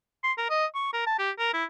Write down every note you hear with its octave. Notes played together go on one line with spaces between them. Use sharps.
C6
A#4
D#5
C#6
A#4
A5
G4
A#4
E4